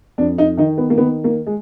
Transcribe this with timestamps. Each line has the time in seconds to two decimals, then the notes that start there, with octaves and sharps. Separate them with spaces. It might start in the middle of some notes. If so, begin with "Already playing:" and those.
0.18 F2 D4
0.38 D#4
0.57 D#3 D#4
0.78 B3
0.90 A#3
0.98 D#3 B3
1.24 A#3
1.46 G#3